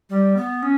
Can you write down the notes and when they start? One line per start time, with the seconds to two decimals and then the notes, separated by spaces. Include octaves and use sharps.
0.10 G3
0.36 B3
0.63 C#4